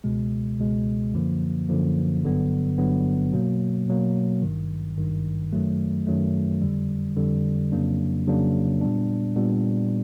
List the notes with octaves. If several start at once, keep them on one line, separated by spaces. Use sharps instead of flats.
C#2 B2 G#3
C#2 B2 G#3
F#2 D3 F3 A#3
F#2 D3 F3 A#3
G1 G2 D3 F#3 B3
G1 G2 D3 F#3 B3
B2 F#3 A#3
B2 F#3 A#3
G#1 G2 D#3
G#1 G2 D#3
F#2 D#3 F#3 A3
F#2 D#3 F#3 A3
F2 D3 G3
F2 D3 G3
F2 C#3 F#3 A#3 D4
F2 C#3 F#3 A#3 D4
A#2 G3 B3 D4
A#2 G3 B3 D4